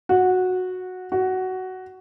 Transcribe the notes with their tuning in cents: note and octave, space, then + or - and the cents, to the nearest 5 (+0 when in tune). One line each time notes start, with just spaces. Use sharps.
F#4 -10
F#4 +10